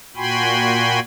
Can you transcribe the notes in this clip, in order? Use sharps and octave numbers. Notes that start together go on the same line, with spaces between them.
A#2 F#4 G5 G#5 B5 C6